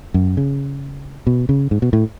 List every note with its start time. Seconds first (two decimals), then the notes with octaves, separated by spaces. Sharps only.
0.14 F#2
0.37 C#3
1.27 B2
1.49 C#3
1.71 G#2
1.82 B2
1.93 A2